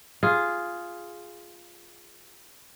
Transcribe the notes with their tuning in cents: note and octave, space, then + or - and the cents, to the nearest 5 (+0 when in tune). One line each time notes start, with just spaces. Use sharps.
F4 +0 G#4 +0